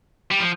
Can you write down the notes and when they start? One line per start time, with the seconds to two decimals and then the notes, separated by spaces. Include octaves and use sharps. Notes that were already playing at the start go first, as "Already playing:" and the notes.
0.31 G3
0.40 F3